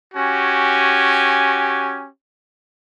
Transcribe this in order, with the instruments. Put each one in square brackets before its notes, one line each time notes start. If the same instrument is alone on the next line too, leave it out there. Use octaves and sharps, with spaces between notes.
[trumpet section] C#4 F#4 G4 G#5